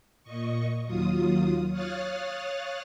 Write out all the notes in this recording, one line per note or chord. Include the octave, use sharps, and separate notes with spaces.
A#2 D#5 C#6
D#2 F#3 F4 D#6
C#5 F5 D#6 F6 F#6 A6